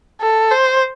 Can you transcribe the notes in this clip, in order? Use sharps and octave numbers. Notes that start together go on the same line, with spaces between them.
A4
C5